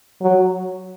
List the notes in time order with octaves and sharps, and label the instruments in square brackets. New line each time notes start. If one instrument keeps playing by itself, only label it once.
[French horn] F#3